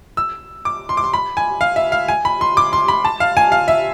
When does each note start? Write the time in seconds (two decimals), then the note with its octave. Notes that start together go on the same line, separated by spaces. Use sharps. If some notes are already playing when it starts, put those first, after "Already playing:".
0.17 E6
0.65 D6
0.89 C6
0.97 D6
1.04 C6
1.14 B5
1.37 G#5
1.61 F5
1.76 E5
1.92 F5
2.08 G#5
2.25 B5
2.41 C6
2.57 D6
2.73 C6
2.88 B5
3.05 A5
3.20 F5
3.37 G#5
3.52 F5
3.68 E5